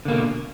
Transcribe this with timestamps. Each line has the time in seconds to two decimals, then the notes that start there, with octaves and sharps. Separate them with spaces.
0.05 D3
0.08 A#3
0.11 B2